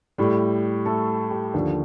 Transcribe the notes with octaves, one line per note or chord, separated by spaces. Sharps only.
A2 G3
A3 A4
G4
D#2 D3 F3